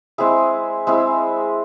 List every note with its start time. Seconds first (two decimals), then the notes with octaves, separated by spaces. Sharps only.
0.18 G#3 C4 E4 G#4
0.87 G#3 C4 E4 G#4